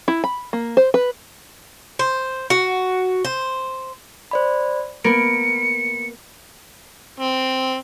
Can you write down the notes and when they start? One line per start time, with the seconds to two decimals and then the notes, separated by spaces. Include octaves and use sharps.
0.08 E4
0.24 B5
0.53 A#3
0.77 C5
0.94 B4
1.99 C5
2.50 F#4
3.25 C5
4.31 C5 D5 B5
5.04 A#3 B3 A#4 C#7 D7
7.20 C4